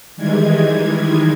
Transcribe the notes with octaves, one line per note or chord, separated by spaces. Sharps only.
D#3 E3 G3 G#3 G#6